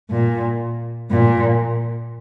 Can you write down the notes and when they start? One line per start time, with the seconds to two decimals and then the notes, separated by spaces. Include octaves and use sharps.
0.10 A#2
1.11 A#2